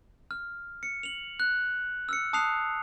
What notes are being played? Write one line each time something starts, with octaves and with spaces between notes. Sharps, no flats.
F6
C#7
F7 F#7
F#6
E6 F6 C#7
A5 D#6 F#6 C7 F7